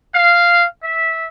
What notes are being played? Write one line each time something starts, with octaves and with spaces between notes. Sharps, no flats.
F5
E5